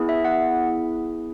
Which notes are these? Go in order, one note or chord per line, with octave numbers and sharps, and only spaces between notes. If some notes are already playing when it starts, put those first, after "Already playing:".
Already playing: B3 E4 G#4
E5
F#5